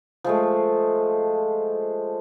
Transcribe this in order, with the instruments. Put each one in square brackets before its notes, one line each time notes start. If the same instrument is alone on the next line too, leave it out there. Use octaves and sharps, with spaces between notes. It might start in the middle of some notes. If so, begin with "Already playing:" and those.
[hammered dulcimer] F3 G#3 A3